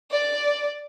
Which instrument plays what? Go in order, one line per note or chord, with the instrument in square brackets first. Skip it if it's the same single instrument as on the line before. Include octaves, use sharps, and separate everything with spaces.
[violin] D5